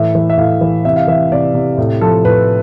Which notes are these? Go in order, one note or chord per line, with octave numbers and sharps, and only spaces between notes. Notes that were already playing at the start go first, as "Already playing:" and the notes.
Already playing: A2 E3 E5
E3
E5
A2 F5
E3
C3 E5
F5
E3 E5
C3 D5
C3
A2
F3 A4
A2 B4